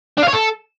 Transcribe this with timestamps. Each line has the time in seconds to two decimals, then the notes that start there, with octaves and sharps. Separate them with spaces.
0.18 D4
0.23 F5
0.28 C#5
0.33 A4